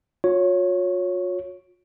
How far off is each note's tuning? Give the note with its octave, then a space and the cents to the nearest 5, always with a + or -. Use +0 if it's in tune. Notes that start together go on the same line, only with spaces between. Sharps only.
F4 +45 C#5 +0